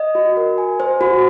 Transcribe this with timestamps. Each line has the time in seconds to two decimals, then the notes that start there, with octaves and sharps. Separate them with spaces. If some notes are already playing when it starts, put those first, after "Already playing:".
Already playing: D#5
0.15 F#4
0.37 A#4
0.58 G#5
0.80 C5
1.01 F#4